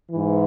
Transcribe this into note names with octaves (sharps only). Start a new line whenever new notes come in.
G#2 E3